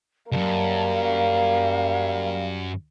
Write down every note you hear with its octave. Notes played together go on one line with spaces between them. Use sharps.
C#2 F#2 G3 A#3 A5
F5